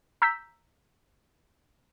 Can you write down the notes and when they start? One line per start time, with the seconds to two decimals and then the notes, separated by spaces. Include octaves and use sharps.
0.22 A#5 E6 G6 B6